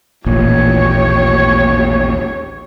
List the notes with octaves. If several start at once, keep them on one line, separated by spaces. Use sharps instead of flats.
A1 D#2 A#2 G4 C#5